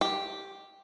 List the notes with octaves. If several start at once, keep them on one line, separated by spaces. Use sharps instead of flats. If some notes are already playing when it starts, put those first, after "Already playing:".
G4